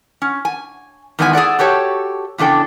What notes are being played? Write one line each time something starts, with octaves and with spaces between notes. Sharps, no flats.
C#4
G#5
E2 D#3 G#3 B3 F4 G#5
G#4 A4 D5 F#5
F#4 G4 A4 C#5
E2 C#3 D4 A4 G5